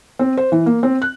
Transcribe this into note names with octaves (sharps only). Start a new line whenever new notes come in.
C4
C5
E3
A#3
C4
F#6